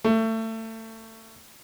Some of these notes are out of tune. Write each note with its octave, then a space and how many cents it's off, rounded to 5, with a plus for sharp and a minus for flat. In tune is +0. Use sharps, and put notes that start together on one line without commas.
A3 +25